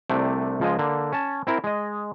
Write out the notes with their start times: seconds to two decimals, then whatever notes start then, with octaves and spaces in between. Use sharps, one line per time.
0.09 C2 C3 A3 D4 G5
0.60 C#2 F3 G#3 D#5
0.79 D3 A#3
1.12 C#4 A5
1.47 C4 E4 A#4 E5
1.64 G#3 D#5